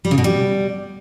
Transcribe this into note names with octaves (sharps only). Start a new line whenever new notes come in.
G3
C#3
B2
G3